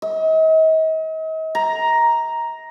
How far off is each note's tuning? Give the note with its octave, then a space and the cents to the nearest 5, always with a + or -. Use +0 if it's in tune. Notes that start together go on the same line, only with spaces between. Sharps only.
D#5 +40
A#5 +5